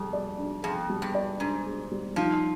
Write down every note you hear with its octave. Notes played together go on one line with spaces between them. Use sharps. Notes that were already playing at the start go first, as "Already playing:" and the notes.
Already playing: F2 G3 G#4
D5
D4
F2 G#4
G3
G2
D5
G#2 D4
G#4
G3
F3 D#4